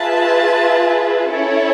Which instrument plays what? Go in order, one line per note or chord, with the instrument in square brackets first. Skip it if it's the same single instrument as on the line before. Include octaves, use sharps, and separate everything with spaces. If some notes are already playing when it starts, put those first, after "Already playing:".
Already playing: [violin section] F4 G#4 B4 E5 A5
C#4 E4 A4 C#5